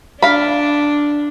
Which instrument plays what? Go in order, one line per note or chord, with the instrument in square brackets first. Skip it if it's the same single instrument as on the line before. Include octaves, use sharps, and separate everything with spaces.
[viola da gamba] D4 [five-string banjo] F5 B5